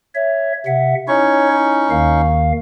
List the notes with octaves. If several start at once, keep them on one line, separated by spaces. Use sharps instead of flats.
C#5 E5
C3 E5 F#5
C#4 D#4 E4 C#5 C#6
E4
D#2 D#3 F5